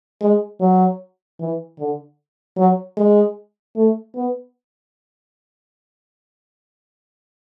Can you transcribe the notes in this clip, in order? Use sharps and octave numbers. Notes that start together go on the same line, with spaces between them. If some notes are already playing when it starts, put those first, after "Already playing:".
G#3
F#3
E3
D3
F#3
G#3
A3
B3